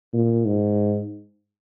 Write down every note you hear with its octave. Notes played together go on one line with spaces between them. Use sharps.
A#2
G#2